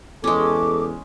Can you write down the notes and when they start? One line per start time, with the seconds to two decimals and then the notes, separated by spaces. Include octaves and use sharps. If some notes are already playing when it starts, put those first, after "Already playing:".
0.24 E2 G#3 C#4 A4 D6